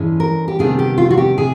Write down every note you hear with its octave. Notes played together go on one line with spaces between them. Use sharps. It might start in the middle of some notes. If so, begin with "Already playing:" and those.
Already playing: G2 E3 G#3 C#4
A#4
G4
C3 D#3 G3 B3 D4 G#4
G4
F4
F#4
G4
C3 G#4